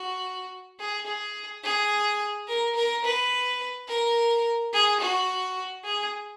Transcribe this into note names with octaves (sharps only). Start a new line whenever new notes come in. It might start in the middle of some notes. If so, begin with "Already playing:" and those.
Already playing: F#4
G#4
G#4
G#4
A#4
A#4
B4
A#4
G#4
F#4
G#4